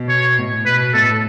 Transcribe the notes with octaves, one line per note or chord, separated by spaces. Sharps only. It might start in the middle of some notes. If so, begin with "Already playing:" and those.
Already playing: B2
C#5
A2
B2 B4
A2 A4